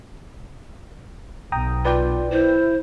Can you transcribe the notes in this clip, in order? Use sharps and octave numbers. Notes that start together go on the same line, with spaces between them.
B1 G5 A#5 D#6
F4 B4 D5 G5
E4 C5